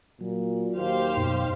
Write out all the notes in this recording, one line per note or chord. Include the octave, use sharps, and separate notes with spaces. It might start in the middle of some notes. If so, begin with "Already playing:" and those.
A#2 F#3
D#2 G4 C5 F5
F#2 B2 D#4